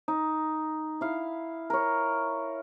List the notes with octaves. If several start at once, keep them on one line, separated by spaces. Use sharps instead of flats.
D#4
E4 F5
A#4 C#5